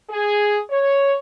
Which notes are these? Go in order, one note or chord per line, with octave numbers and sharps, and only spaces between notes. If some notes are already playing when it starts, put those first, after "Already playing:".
G#4
C#5